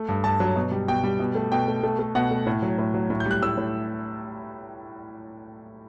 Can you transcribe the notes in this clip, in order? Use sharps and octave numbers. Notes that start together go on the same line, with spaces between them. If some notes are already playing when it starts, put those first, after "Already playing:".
Already playing: A3
G2
G2 A5
F#3
B2
G3
B2 G5
G3
B2
A3
B2 G5
A3
A3
A3
B2 F#5
A3
A2
F#3
A2
F#3
A2
G6
G3 F#6
A2 E6
A2